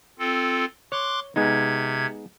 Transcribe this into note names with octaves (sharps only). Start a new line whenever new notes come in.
C4 F4 A4
C#5 C6 D6 F#6
C3 G#3 B3 D#4 G#6